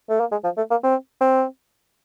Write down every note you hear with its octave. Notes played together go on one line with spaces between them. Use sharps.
A3
A#3
G#3
F3
A3
A#3
C4
C4